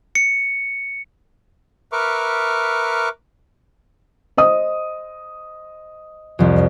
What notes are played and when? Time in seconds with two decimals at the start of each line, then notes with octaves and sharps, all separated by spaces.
0.15 C#7
1.92 A#4 B4 E5 C#6 D6 F6
4.37 C5 D#5 D#6
6.39 C2 F2